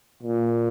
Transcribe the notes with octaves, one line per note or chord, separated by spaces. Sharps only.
A#2